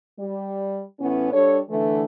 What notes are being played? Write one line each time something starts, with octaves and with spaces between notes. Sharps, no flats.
G3
A2 E3 B3 C#4
G3 D4 A4 C#5
D3 E3 A3